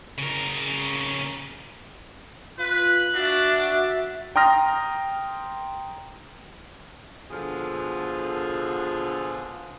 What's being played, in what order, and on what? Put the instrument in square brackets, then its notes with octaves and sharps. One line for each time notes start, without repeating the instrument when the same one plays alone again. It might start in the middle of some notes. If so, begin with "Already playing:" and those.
[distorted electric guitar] C#3 A#4
[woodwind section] F4 [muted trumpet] B4 [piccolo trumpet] F#6
[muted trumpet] D4 [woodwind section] F#4 E5
[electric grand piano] G5 A#5 C6 D#6 F6 A#6
[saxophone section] B2 D3 F3 F4 G#4 A4